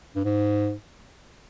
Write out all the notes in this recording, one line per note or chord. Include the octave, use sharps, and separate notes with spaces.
G2
G#2